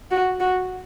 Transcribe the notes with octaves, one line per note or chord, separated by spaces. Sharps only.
F#4
F#4